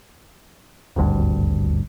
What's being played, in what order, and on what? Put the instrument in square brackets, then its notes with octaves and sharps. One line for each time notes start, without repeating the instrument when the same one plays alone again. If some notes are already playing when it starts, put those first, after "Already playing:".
[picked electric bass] D#1 G#1 D2 G2